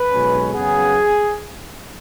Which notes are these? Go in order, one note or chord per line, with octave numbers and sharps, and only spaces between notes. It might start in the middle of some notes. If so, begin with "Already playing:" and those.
Already playing: B4
B1 B2 G#3 C#4
F#2 C#3 B3 G#4